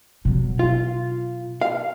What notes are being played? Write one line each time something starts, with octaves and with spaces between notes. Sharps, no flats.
B2 F#3
F4
F5